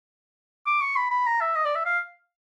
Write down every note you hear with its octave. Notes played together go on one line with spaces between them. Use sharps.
D6
C#6
B5
B5
A#5
E5
D#5
D5
E5
F5